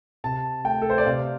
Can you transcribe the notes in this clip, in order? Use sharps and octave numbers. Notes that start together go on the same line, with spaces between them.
C3 A5
A3 G5
A4
C5
D5
C3 F5